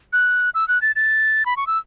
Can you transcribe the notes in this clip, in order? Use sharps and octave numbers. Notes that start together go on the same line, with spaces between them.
F#6
E6
F#6
A6
A6
B5
C#6
E6